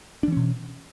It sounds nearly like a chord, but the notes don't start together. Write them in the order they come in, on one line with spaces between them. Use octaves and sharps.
D4 E3 C#4 B2